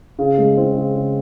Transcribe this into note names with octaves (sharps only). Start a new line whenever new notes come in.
C#3
G#3
C4
C#3
C#3